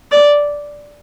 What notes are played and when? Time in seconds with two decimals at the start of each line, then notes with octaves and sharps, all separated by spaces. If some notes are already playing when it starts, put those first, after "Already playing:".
0.12 D5